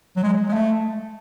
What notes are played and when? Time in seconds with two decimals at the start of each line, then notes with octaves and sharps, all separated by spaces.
0.16 F#3
0.23 G#3
0.49 G#3
0.53 A3